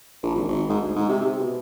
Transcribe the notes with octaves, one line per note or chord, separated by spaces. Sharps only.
A#1
G#1
G#1
G#2
D2
G#2
C3
C3
B2